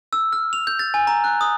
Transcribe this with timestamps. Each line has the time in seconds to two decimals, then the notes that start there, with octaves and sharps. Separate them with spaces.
0.13 E6
0.33 F6
0.53 F7
0.67 G6
0.79 A6
0.94 G#5
1.07 A#5
1.24 F#6
1.41 D#6